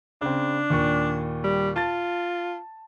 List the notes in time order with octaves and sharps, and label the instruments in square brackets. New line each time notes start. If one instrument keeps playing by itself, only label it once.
[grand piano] C#3 C4 [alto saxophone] D4
[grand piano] D#2 A#2 C#6
[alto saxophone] G3
[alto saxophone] F4 [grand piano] A5 A6